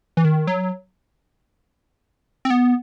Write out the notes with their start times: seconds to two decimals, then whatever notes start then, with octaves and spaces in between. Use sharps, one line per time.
0.17 E3
0.25 D#3
0.47 F#3
2.45 C4
2.50 B3